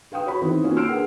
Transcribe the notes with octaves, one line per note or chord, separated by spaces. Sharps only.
B4 F5 G5 D#6
F#4 C#5 B5
D#3 E3 C4
A#3 C#4 D#4 F4 F#4
E6 F6 C7 D7
D4 G#4 A#4 B4 F#5